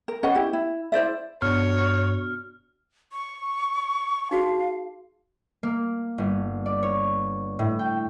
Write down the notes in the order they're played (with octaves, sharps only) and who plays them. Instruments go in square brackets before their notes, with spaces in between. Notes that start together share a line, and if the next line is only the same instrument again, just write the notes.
[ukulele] A#4
C#4 B4 D#5 F#5
E4 G4
E4
E4 C5 D5 E5
[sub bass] G2 [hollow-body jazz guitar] B2 D4 [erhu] C#5 [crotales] F6
[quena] C#6
[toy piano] D#4 F#4 G#4 [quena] F5
[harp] A#3
G1
D5
C#5
A2
G5